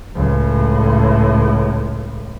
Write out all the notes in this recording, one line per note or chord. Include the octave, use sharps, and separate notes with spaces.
C#2 A2